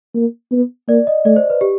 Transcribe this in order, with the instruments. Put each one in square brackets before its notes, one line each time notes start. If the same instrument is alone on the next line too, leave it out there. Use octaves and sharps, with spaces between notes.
[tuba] A#3
B3
[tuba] A#3 [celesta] D5
[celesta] D#5
[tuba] A3 [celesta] D5
[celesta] C5
B4
G4